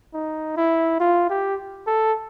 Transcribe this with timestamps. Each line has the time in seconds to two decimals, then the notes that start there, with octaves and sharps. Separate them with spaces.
0.14 D#4
0.57 E4
1.00 F4
1.30 G4
1.87 A4